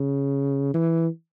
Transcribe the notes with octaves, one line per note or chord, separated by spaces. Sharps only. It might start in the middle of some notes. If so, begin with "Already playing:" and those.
Already playing: C#3
E3